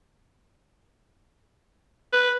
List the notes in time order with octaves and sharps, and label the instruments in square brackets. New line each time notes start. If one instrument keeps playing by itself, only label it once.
[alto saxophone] B4